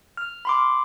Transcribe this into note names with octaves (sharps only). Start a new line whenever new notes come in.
F6
B5 C6 D6